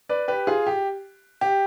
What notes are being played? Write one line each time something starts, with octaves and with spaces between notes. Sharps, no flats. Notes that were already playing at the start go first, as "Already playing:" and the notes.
B4 D5
G4 B4
F4 G#4
G4
G4